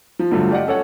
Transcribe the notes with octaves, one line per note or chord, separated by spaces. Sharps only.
F3
G2 D3 F3 F#3 A3
F4 G4 D5 D#5 F#5
C#4 A4 C#5 F#5